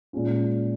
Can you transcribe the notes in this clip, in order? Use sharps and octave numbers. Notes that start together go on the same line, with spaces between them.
A#2 G#3 C#4 F4